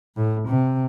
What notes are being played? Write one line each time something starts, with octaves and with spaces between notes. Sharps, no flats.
A2
C3